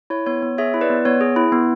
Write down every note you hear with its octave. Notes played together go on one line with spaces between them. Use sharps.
E4 C#5
B3 C#5
B3
G#4 C#5 E5
E4
B4 D5
B3
B3 C#5
G#4
E4
B3